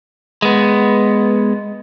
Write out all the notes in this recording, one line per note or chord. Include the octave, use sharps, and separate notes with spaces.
G#3 B3